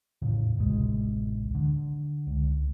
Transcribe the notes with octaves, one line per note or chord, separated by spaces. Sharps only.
E2 A2 C#3
A1 D2 C3 G#3
D3
C#2